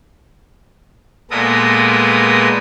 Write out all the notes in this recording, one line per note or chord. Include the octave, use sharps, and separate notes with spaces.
A#2 G#3 B3 A4 A#4 D#6